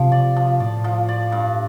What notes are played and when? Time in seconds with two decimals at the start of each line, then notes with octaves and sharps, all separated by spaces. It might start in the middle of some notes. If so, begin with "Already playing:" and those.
Already playing: C3 F3
0.12 D5
0.36 F3
0.60 A2 D5
0.84 F3
1.08 D5
1.32 G2